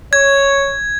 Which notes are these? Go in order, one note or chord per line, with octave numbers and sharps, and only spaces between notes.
C#5 G#6